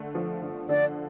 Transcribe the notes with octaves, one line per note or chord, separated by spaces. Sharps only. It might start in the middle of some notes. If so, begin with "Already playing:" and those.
Already playing: D3 A3
F3
D3
D3 D5